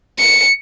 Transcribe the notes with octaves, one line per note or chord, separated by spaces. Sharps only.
C#7